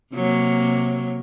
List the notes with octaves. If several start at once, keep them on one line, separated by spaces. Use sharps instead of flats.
C3 F#3 A#3